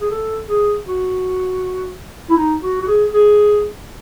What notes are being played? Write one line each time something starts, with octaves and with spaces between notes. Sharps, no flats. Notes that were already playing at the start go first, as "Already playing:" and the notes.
G#4
A4
G#4
F#4
E4
D#4
F#4
F#4
G#4
G#4